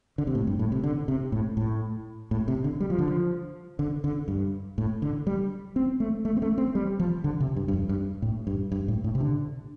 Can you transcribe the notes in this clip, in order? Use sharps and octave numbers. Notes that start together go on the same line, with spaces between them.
D3
C3
A2
G2
A2
C3
D3
C3
A2
A2
A2
C3
D3
G3
F3
D3
F3
D3
D3
G2
A2
D3
G3
C4
A3
A3
C4
A3
C4
G3
F3
D3
C3
G2
G2
F2
G2
A2
G2
G2
A2
A2
C3
D3